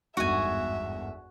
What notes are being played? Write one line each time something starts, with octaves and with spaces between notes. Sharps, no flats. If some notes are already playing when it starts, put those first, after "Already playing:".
G1 E2 G#2 F#4 E5 G#5